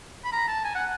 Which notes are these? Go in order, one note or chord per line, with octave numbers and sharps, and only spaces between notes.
B5
A#5
A5
G#5
F#5